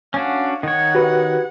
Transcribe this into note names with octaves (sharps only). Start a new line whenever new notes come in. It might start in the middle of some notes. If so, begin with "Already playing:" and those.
C#4 D4 F#4 F5
D#3 C#5 F#5
F#4 G4 B4